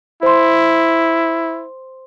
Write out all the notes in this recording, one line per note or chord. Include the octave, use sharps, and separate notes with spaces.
E4 C5 C6